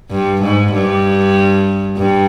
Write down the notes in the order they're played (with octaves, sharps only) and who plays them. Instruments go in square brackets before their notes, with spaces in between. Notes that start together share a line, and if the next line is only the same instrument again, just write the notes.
[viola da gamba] G2
G#2
G2
G2